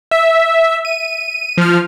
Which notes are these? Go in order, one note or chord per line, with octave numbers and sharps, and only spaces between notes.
E5
D#7
F3 F6